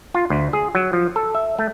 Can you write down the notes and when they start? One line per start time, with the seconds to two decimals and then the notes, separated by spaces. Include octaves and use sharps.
0.14 F4
0.30 D2
0.53 G#4
0.75 F#3
0.93 F3
1.16 A4
1.35 E5
1.59 A3